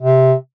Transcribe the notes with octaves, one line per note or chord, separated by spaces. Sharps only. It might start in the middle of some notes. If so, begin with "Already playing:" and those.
C3